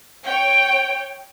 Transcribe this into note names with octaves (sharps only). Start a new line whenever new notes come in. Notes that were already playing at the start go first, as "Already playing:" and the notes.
C#5 G5